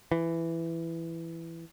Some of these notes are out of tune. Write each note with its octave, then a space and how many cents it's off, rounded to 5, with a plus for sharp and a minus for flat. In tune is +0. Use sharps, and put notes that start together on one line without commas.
E3 +10